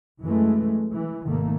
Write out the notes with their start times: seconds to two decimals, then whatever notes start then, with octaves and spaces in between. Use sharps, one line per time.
0.22 F#2 E3 G#3 A3
0.92 E3
1.26 G#1 C3 D#3 A3 A#3